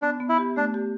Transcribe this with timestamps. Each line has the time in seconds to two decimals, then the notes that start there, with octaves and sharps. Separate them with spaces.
0.02 B3 D4
0.20 B3
0.29 E4
0.38 G4
0.56 A3 D4
0.74 G4